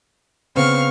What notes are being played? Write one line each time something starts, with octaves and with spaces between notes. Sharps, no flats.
C#3 B3 C4 F5 C#6 F6